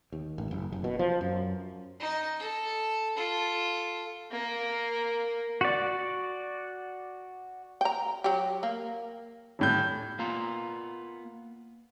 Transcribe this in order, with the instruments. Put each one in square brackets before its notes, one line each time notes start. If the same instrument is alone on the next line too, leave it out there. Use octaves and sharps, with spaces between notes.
[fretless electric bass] D#2
A1
F#1
F#1
B2
F3
F#2
[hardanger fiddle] D#4 D#5
A4
F4 A4
A#3
[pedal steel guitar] F#4 D5
[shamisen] G5 A#5
F#3 G4
A#3
[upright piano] D#1 A2 G6
[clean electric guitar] A#3 B3 F4 A#5